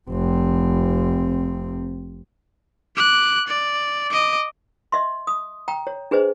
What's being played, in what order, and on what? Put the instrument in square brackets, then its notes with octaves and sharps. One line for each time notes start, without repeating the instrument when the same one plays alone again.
[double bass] F1 C4
[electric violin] D6 F#6
D5
D#5 D6
[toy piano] D#5 E5 C6
D#6
G5 A#5
C#5
D4 G#4 B4 C5 D#5